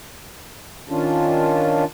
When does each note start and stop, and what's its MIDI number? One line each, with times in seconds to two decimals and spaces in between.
0.89 1.84 51
0.89 1.84 61
0.89 1.84 62
0.89 1.84 65